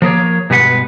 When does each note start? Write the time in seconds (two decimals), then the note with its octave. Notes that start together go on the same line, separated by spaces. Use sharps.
0.02 F3 A#3 G#4 C#5
0.50 G2 B2 G#3 B4 F#5